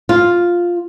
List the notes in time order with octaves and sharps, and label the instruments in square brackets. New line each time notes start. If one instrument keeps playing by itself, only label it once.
[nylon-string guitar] F4